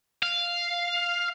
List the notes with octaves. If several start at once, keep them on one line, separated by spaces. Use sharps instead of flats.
F5